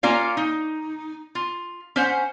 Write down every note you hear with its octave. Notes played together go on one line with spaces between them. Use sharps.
A#3 C#4 F4 D5 F5
D#4
F4
C#4 C5 F#5